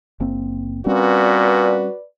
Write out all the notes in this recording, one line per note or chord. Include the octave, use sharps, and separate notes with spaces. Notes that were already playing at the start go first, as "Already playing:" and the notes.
F#1 A#3 C4
A#2 G3 C4 C#4 F#4 B4 D5